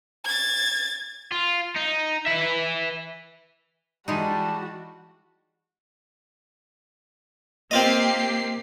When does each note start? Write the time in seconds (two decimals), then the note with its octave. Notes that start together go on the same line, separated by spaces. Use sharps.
0.25 G#6 A6
1.32 F4
1.76 D#4
2.26 B4 E5
4.08 E3 G3 G#3 D#4 F#4 A5
7.71 A#3 C4 F4 G4 D#5 C7